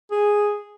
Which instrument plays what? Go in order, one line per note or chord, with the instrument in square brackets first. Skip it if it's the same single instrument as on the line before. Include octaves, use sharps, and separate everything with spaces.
[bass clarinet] G#4